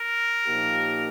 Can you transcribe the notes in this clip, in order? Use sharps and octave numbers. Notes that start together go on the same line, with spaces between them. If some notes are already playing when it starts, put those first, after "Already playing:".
Already playing: A#4
A#2 F3 A#3 D#4 G4